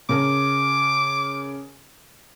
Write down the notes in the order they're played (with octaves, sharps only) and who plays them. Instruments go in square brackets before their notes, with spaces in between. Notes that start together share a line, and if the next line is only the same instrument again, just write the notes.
[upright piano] C#3 A#4 A5 [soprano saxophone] D6